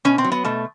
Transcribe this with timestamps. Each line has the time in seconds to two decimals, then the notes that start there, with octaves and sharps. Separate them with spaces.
0.05 B2 C#4
0.18 C4
0.24 F#3
0.32 B3
0.45 B2 A3